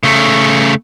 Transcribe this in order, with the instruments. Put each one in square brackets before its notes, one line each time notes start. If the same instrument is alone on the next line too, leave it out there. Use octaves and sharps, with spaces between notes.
[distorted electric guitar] C#3 A3